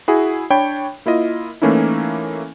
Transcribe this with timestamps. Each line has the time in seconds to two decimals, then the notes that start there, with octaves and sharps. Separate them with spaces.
0.08 E4 F#4 G#4
0.50 D4 C#5 G5 B5
1.06 A#3 E4 F4 D#5
1.62 E3 A3 A#3 C#4 D#4 E4